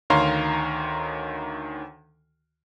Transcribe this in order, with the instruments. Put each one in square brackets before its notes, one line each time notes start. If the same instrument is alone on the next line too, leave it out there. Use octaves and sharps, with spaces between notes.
[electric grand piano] D2 D#3 C#5 F5 A#5 C6